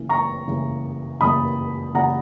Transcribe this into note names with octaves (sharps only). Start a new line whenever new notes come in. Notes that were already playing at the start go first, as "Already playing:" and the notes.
Already playing: C#3 E3 A#3
A#5 C#6
C#3 E3 A#3
C#3 E3 A#3 B5 D#6
C#3 E3 A#3 F#5 A#5